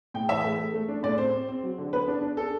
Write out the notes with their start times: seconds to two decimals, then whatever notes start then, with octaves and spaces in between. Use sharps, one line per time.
0.14 A2 G5
0.29 E3 E5
0.44 A3
0.58 A3
0.74 A3
0.88 D4
1.03 A2 D5
1.18 C4 C5
1.33 C4
1.48 C4
1.63 F#3
1.78 D3
1.93 B3 B4
2.08 D4
2.21 D4
2.37 D4 A4